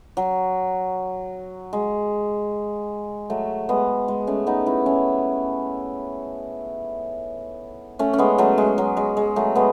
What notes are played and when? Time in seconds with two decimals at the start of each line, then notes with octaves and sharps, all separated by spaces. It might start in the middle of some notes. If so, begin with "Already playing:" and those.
0.17 F#3
1.73 G#3
3.30 F#3 A3
3.69 G#3 B3
4.08 G#3
4.27 A3 C#4
4.47 B3 D#4
4.66 C#4 E4
4.86 C#4 E4
7.99 A3 C#4
8.13 C#4
8.18 G#3 B3
8.38 F#3 A3
8.58 G#3
8.78 F#3
8.97 G#3
9.17 G#3
9.36 F#3 A3
9.56 G#3 B3